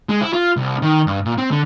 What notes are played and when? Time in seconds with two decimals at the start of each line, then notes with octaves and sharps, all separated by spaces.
0.09 G#3
0.21 E4
0.33 F4
0.57 C2
0.82 D#3
1.07 G2
1.25 A#2
1.38 C4
1.51 D3